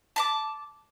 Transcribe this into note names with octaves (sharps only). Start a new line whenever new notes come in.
A5 B5 D6